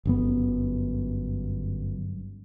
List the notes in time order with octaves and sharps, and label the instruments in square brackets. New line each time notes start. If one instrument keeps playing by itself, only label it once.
[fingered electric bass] G1 F#2 B3